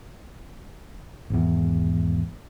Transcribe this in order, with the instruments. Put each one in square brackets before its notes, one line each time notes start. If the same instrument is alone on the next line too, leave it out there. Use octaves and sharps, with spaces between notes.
[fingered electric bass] G#1 E2